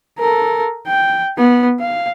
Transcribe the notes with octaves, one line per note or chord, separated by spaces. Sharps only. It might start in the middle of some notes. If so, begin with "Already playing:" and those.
A4 A#4
G5
B3
F5